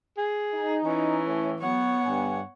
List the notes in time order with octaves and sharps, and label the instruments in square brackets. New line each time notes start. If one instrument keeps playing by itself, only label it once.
[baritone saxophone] G#4
[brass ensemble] D#4
[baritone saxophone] E3 [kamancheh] C#4
[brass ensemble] A2
[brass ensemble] F#3 [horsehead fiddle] B3 [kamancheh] C#5 F#5
[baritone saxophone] G2 [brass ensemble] D3 G#5